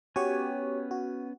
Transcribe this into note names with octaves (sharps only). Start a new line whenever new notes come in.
B3 C#4 F#4 G4 C#5 G#5
F#4